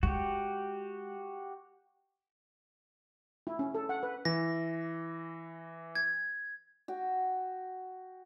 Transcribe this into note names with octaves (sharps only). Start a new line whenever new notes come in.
G#3 F#4 G4
E4
C#4
A4
F#5
B4
E3 A#6
G#6
F#4 G5